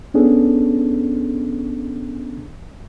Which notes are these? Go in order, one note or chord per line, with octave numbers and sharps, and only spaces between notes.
B3 C#4 D4 G#4 A4